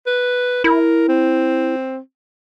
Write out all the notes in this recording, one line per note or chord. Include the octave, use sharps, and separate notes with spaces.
B4
E4 A#4
C4